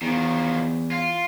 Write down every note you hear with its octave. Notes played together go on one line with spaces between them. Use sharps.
E2 D#3 F3
F4